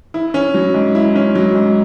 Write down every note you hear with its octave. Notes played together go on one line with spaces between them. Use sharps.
E4
C#4
F#3
G#2
E4
C#4
F#3
G#2